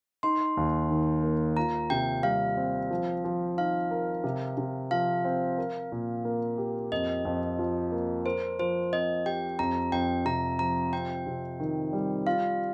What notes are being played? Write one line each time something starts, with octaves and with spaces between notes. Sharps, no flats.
D#4 C6
D#2
D#3
A#3
F4 A#5
C3 G5
G3 F5
C4
F3
F3
D#4 F5
A#4
C3
C3
F3 F5
C4
A#4
A#2
A#3
G4
F2 D#5
F2
F3
A#3
A#4 C5
F3 C5
C4 D#5
G4 G5
F2 A#5
F2 G5
C3 A#5
F3 A#5
C4 G5
C3
D#3
G3
F4 F5